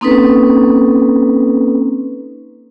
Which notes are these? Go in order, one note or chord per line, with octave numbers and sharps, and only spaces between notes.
A#3 C4 C#4 D#4 A4 B4